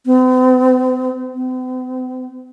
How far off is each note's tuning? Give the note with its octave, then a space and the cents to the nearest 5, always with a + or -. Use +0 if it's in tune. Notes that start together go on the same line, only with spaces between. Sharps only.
C4 -45
C4 -45